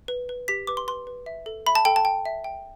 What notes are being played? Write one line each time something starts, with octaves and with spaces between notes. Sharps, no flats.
B4
B4
G4 B6
B4 D6
C6
B4 C6
B4
E5
A4
E5 B5
A5
A4 G5
A5
G5
E5
G5